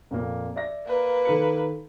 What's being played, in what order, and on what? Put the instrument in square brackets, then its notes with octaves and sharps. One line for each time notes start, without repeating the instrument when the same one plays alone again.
[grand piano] F2 A#2 A#3
D5 E5 A#6
[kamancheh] A#3 B4
[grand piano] D#3 A4 C#7